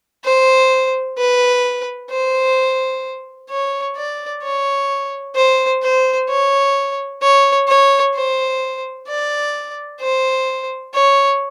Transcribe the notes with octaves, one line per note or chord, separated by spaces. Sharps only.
C5
B4
C5
C#5
D5
C#5
C5
C5
C#5
C#5
C#5
C5
D5
C5
C#5